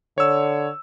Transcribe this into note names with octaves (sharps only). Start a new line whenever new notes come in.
D3 C#5 E6